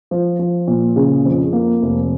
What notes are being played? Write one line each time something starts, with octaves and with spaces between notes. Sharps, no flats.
F3
F3
A#2
C#3
F2
A#3
F1